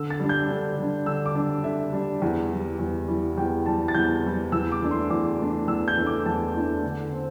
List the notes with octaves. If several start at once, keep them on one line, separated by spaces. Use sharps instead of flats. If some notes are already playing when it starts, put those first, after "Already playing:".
Already playing: D3 E6
A6
G3 D4
G6
D3
G3 D4
D3 E6
D6
G3 D4
D3 E5
G3 D4
E2
E3 G3
E2
E3 G3
E2 G5
E3 G3 A5
A6
E2 G6
E3 G3
E2 E6
D6
E3 A3 D4
C6
E2 D6
E3 A3 D4
E2 E6
G6
E3 A3 D4
D6
E2 A5
E3 A3 D4
D3
C4